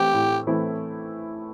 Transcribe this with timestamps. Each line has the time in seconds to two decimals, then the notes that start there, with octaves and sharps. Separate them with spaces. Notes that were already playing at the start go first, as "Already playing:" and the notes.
Already playing: E3 A3 C4 E4 G4
0.14 A2
0.47 E3 A3 C4 E4